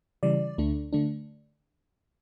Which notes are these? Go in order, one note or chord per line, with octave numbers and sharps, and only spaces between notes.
C#3 E3 G3 D5
D2 D3 A3 D4
D3 A3 D4